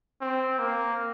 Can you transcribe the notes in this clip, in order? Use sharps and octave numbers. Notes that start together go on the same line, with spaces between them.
C4
A#3